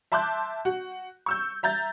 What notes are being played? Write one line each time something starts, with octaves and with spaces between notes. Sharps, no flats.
E5 A5 C6 D6 F#6 G6
F#4
C#6 E6 G6
E5 A#5 G6 A6